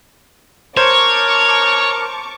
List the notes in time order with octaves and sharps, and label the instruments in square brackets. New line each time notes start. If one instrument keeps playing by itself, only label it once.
[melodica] A#4 [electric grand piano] C5 E7 [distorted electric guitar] C#5 [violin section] A5 C#6 D6